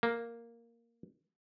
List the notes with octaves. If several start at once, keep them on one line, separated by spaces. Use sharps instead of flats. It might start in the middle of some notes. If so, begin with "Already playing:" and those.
A#3